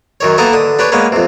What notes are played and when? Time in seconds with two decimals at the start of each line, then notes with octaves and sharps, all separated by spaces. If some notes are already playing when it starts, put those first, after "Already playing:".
0.20 F#2 D#3 C#5
0.38 A#3 B3 A4 A#4 D#5 E5
0.53 D3 D#6
0.79 D4 G4 B4 C#5
0.92 G#3 A#3 B3 C#4
1.12 F2 C3